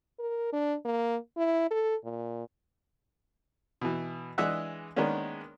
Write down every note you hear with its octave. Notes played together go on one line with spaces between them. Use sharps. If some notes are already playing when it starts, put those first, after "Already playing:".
A#4
D4
A#3
E4
A4
A#2
B2 E3
E3 G#3 D4 D#5 E5 F#5
D#3 G#3 A#3 B3 C#4 D4